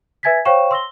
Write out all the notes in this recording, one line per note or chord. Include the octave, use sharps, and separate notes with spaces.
B4 E5 G#5 G#6 A6 B6
C5 C#5 F5 G5 C#6 E7
C6 E6 A#6 G7